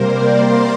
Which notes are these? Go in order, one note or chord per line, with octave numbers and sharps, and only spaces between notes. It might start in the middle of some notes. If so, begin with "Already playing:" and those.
Already playing: C3 G3 A#3 A#4 C5
D5
C6